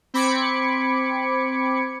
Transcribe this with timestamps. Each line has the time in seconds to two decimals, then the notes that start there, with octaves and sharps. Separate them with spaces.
0.14 C4 B5 D6 G#6 C#7